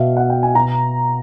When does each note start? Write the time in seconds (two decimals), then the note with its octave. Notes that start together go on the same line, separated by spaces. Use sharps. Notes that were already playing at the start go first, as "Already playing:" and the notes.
Already playing: B2 E5 F5
0.17 F#5
0.30 G5
0.43 G#5
0.55 B2 A#5